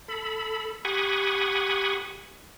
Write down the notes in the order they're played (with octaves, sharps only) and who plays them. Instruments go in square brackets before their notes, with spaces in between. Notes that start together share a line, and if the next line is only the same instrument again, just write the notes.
[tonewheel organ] A4 B5
G4 F#5 G#5 B5 C#6 D#6